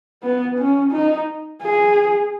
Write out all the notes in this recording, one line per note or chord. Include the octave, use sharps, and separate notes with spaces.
B3
C#4
D#4
G#4